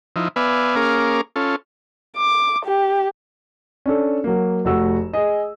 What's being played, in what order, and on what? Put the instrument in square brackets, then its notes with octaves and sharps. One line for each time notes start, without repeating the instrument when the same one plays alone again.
[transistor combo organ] F3 D#4 E4
B3 B4 D5 E5 F5 G#5
A#3 C#4 G#4 A#4 F5 D6
C#4 F4 A4
[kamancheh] D6
G4
[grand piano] C#4 D4 A4
F#3 A#3
F1 A3 F#4 E6
G#4 D#5